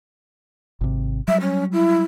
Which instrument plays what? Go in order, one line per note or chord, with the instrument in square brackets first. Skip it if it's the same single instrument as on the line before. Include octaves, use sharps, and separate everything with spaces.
[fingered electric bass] G#1 C3
[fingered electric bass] F#3 G3 [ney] E5
[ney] C#4
E4